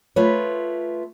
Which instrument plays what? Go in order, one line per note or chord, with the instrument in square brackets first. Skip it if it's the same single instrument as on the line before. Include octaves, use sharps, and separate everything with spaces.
[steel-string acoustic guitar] A3 F4 B4 C#5